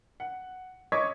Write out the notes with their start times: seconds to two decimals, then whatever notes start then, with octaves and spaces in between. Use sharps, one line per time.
0.20 F#5
0.92 C#5 D#5 C#6 D6 G#6 B6